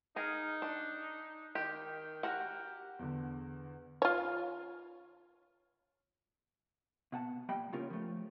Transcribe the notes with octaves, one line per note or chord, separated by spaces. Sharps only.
D#4 G#4 A#4
D4
D#3 G4
F#4 G4 A#4 F#5
E2 D3
F4 C#5
B2 F#5 A5
A#2 G3 D#5 G5 B5
C#3 A#3 C#4 F4 G4 A#4
F3 A3